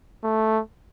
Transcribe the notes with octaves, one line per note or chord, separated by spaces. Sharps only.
A3